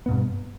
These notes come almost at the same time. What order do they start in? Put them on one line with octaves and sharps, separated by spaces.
B3 B2 G2